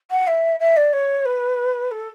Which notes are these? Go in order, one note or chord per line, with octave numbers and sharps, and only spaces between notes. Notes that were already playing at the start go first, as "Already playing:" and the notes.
F#5
E5
E5
D5
C#5
B4
A4